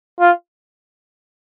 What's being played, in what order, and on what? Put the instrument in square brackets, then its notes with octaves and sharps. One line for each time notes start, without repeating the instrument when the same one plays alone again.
[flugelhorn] F4